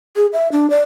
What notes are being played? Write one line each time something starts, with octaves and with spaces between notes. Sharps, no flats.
G#4
E5
D4
D5